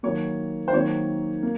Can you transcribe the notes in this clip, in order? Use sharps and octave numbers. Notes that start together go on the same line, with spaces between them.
D#3 F#3 A#3 C#5
C5
D#3 F#3 A#3 C#5
A#3